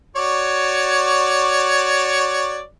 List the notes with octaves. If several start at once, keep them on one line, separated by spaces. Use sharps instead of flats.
F#4 C#5 D5